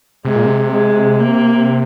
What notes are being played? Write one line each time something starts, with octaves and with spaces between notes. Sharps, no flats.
C3 G#3
A#2
C3
G#3
A#3